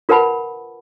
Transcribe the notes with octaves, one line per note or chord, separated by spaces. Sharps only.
F4 A#4 B4 F#5 A5 B5